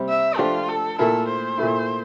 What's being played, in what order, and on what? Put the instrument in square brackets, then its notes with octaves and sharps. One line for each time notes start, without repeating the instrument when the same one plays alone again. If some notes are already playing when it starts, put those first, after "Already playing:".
Already playing: [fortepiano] C3 G3 C4
[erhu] E5
[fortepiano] F3 A3 D4 G4 [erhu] F4
[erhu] A4
[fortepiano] A#2 A3 E4 A#4 [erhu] A4
[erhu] C5
[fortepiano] A#2 A3 E4